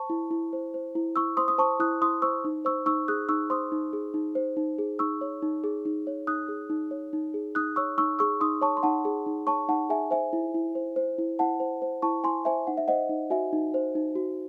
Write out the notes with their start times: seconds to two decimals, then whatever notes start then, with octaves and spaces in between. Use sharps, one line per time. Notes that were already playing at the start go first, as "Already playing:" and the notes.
Already playing: C5 A5 C#6
0.10 E4
0.31 E4
0.53 C5
0.74 C5
0.95 E4
1.16 E4 C#6 E6
1.37 C5 C6 D#6
1.48 D#6
1.58 C5 A5 C#6
1.80 E4 D#6 F#6
2.02 E4 C6 D#6
2.22 C5 C#6 E6
2.45 D#4
2.65 C5 C#6 E6
2.86 D#4 C#6 E6
3.08 G#4 D#6 F#6
3.29 D#4 C#6 E6
3.50 C5 C6 D#6
3.72 D#4
3.93 G#4
4.14 D#4
4.35 C5
4.57 D#4
4.78 G#4
4.99 D#4 C#6 E6
5.21 C#5
5.42 D#4
5.64 G#4
5.85 D#4
6.07 C#5
6.27 D#4 D#6 F#6
6.49 G#4
6.70 D#4
6.91 C#5
7.13 D#4
7.34 G#4
7.55 D#4 D#6 F#6
7.76 C#5 C#6 E6
7.98 D#4 C#6 E6
8.19 G#4 C#6 E6
8.41 D#4 C6 D#6
8.61 C#5 A5 C#6
8.77 C6
8.83 D#4 F#5 A5
9.05 G#4
9.26 D#4
9.47 C#5 A5 C#6
9.69 D#4 F#5 A5
9.89 G#4 E5 G#5
10.11 C5 E5 G#5
10.33 E4
10.54 E4
10.75 C5
10.96 C5
11.18 E4
11.39 E4 F#5 A5
11.60 C5
11.82 C5
12.02 E4 A5 C#6
12.24 E4 G#5 C6
12.45 C5 E5 G#5
12.67 D#4 F#5
12.77 E5
12.88 C5 D#5 F#5
13.09 D#4
13.30 F#4 E5 G#5
13.53 D#4
13.74 C5
13.95 D#4
14.16 F#4